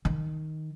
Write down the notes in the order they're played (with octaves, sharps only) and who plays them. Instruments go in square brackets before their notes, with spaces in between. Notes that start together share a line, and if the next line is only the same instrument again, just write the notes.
[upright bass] D#3